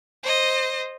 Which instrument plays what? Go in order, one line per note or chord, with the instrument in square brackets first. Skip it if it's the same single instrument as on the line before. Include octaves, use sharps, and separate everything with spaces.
[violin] C5 D#5